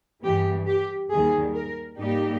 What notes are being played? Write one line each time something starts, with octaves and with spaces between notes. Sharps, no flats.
G2 E3 G#3 B3 G4
G4
D#2 D#3 G3 G#4
A#4
G#2 G3 A#3 D#4 G4